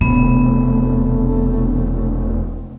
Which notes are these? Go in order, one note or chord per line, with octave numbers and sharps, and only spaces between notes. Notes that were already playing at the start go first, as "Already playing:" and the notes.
E1 C3 A3 B3